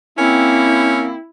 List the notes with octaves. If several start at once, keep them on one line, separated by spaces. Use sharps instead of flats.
A#3 C4 C#4 E4